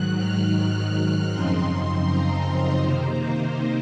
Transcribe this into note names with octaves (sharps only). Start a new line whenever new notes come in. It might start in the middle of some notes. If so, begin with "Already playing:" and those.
Already playing: G#2 D#3 F#3 F#6
F6
F#2 C#3 F3 C4 D#4 C6
A#5
C3 D#3 A#3 D#4 C5